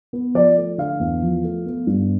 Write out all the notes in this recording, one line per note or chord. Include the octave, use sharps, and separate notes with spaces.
B3
F3 D5
A3
D3 F5
E2
F3
A3
B3
G2